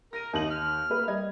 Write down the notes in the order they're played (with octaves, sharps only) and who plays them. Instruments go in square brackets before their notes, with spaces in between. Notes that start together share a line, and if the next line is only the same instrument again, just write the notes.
[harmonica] A#4 [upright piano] A#6 D#7
[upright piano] D#2 F#7 [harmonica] D#4
[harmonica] F6
[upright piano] A#3 B4
G3 D#5 G#6